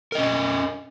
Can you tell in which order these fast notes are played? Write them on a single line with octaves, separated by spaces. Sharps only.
A#4 D#5 C#4